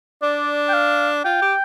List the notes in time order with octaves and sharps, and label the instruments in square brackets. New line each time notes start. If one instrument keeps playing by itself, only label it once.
[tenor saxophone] D4 [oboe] D5
[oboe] G5
F5
[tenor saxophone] F4 [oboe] G5
[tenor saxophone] G4